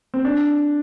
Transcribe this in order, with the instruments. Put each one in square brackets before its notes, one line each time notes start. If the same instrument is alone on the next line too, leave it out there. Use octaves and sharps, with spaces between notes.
[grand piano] C4
D4